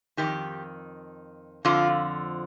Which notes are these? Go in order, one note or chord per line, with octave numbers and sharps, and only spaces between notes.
F2 C3 D#3 G4
F2 D3 F3 F4